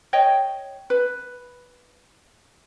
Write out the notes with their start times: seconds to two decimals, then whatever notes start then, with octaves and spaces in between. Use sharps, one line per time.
0.13 C#5 D#5 G5
0.90 B4